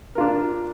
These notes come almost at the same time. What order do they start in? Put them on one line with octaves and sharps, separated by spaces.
A#4 F4 D4